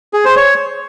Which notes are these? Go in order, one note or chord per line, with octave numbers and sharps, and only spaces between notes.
G#4
C5
C#5